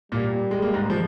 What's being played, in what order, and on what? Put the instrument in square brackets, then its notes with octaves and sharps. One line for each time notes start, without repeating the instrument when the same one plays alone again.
[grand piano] A#2 A#3 [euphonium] G3
[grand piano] G#3
A#3
G#2 G#3
F3